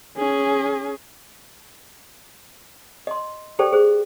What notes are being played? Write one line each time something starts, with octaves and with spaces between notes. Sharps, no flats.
C#4 G#4
D#5 C6
G4 A4 C5 D5 G5
G#4 C5